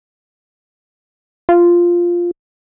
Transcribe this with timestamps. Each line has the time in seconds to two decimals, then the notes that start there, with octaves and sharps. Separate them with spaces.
1.49 F4